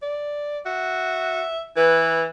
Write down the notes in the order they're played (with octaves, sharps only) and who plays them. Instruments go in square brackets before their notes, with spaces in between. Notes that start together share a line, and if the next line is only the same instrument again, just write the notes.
[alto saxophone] D5
[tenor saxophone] F#4 [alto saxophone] E5
[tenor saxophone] E3 [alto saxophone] B4